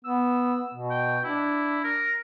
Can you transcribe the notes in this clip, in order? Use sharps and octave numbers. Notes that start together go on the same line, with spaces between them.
B3 E6
B2
G5
D4 E4
A#4